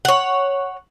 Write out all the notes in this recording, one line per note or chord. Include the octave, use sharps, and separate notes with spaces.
C#5 F#5